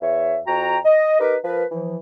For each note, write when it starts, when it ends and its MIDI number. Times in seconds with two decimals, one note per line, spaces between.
0.02 0.40 40
0.02 0.40 73
0.02 0.40 76
0.47 0.78 41
0.47 0.78 66
0.47 0.78 79
0.47 0.78 82
0.85 1.17 75
1.20 1.36 63
1.20 1.36 67
1.20 1.36 70
1.20 1.36 71
1.43 1.64 53
1.43 1.64 70
1.43 1.64 71
1.71 1.96 52
1.71 1.96 53